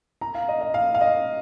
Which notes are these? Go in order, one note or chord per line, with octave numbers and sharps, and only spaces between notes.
A#5
F5
D#5
D#5
F5
F5
D#5